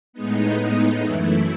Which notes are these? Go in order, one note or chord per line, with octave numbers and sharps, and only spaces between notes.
A2 G#3 B3 D#4
F#2 E3 A3 E4